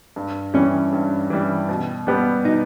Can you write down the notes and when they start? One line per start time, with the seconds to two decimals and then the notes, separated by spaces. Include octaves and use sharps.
0.16 G2
0.54 E3 G3 C#4
0.93 G2
1.30 E3 G3
1.69 B2
2.07 G3 B3 G4
2.45 B2 D#4